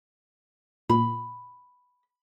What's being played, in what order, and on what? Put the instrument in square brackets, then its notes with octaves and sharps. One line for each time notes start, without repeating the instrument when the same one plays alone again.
[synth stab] A#2 [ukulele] B5